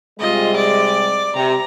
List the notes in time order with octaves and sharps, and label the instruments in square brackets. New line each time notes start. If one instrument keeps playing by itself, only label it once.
[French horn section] C3 G3 G#3 [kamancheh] F4 D#5
[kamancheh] D5 D6
[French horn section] C3 [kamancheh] A#5